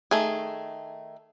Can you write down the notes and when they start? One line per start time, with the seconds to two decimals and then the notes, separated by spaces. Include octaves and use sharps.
0.11 D#3 A3 G#4